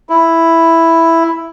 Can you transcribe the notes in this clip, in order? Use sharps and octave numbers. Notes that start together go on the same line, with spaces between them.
E4